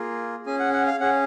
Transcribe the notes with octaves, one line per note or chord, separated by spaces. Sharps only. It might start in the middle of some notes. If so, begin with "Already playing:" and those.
Already playing: A#3 F4 G#4
C#4 G#4 G#5
F#5
F#5
F5
C#4 G#4 F#5